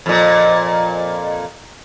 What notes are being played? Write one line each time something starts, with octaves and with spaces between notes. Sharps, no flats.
F2 A#2